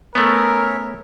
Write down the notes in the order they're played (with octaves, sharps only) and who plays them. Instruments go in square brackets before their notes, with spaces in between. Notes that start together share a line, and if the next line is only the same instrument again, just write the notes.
[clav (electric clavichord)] A3 B3 [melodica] C#4 C#5 E5 [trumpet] A#4